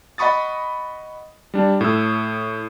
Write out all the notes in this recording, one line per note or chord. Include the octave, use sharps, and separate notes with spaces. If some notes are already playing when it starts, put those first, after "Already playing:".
D#5 F#5 B5 C#6 D#6 A6
G3 D4
A2 E6